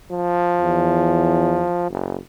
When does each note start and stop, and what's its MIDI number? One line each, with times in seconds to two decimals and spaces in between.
0.10 1.85 53
0.60 1.67 40
1.90 2.17 30